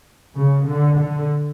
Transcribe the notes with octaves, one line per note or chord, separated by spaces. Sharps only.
C#3
D3
D3